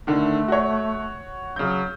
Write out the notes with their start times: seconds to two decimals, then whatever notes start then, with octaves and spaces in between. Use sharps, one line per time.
0.07 D3 D#3 A3
0.48 F#4 C#5
1.56 C#3 F#3 G6